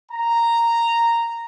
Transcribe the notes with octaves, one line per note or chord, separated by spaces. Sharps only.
A#5